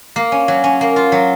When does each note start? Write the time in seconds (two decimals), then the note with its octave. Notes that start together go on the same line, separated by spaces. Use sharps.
0.16 A#3
0.32 C#4
0.48 F#3
0.64 C#4
0.81 A#3
0.96 F4
1.12 F#3